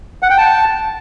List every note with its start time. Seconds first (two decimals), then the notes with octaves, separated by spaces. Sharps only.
0.23 F#5
0.30 G5
0.38 A5